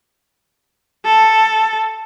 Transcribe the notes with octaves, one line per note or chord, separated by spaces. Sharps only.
A4